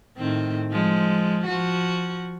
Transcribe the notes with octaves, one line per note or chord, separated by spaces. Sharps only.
A2 D#3 C4
F3 G#3
F3 F#4